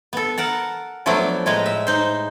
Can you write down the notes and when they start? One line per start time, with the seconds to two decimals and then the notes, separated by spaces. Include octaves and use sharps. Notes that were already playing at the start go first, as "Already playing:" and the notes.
0.13 B3 A4
0.38 A#4 F#5 A5
1.06 F3 F#3 A3 B3 D4 E4
1.46 A2 G#3 B4 A#5
1.66 E5
1.87 D#4 C5